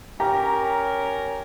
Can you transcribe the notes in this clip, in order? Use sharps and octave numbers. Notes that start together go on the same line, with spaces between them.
C#4 G4 A#4 A#5